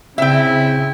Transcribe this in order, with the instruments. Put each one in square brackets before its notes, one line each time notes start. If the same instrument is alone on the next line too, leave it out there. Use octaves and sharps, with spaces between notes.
[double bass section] C#3 [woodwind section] C4 E4 [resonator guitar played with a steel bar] E5 G5